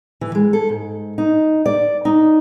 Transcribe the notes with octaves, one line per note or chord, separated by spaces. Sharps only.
E3
G#3
A4
G#2
D#4
D5
D#4